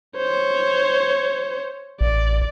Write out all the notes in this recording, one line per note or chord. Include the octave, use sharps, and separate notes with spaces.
C5 C#5
A1 D5